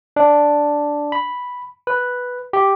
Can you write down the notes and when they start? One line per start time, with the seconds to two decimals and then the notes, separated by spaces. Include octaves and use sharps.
0.16 D4
1.12 B5
1.87 B4
2.53 G4